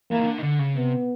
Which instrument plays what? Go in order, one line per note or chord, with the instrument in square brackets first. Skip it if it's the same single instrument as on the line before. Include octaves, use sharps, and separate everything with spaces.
[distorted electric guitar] E3 [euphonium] A#3
[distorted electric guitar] D#3
D3
D#3
D3
C#3
[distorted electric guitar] C3 [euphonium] B3